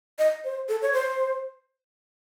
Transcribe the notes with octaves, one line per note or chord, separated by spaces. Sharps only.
D#5
C5
A4
C#5
C5